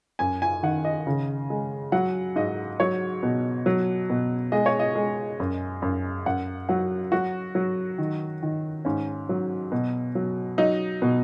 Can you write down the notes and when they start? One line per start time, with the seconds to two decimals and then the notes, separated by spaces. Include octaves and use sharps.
0.19 F#2 G#5
0.42 G#5
0.63 D#3 F#5
0.85 D#5
1.07 C#3
1.50 G#3
1.92 F#3 F#5
2.36 G#2 D#5
2.80 F#3 C#5
3.23 B2
3.66 F#3
4.10 B2
4.52 G#3 D#5
4.66 C#5
4.79 D#5
4.95 G#3
5.40 F#2
5.82 F#2
6.26 F#2 F#5
6.69 F#3 F#5
7.12 F#3 F#4
7.55 F#3
7.98 D#3
8.43 D#3
8.85 G#2 C#4
9.29 F#3
9.72 B2
10.15 F#3
10.58 F#3 D#4
11.02 B2